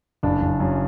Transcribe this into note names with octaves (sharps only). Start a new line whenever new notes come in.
F#1 D4
F#1
F#2